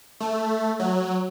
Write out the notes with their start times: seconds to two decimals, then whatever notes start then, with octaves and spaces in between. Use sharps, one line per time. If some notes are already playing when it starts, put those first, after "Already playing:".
0.20 A3
0.80 F#3